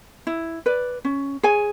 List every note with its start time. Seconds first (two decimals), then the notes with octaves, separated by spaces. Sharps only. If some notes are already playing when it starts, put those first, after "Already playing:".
0.27 E4
0.66 B4 D5
1.05 C#4
1.43 G#4 C#5 G#5